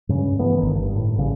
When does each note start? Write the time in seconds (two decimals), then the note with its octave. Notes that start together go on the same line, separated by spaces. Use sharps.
0.09 G2 C#3 C#4
0.39 C#3 E3 A3 B3
0.59 G1 D#3
0.76 G2
0.95 A2
1.18 A1 C#3 G3